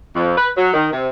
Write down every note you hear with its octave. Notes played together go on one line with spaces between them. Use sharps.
F2
B4
F#3
D#3
C3